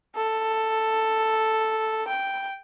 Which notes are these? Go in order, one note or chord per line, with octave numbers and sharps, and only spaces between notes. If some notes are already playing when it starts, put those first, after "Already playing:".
A4
G5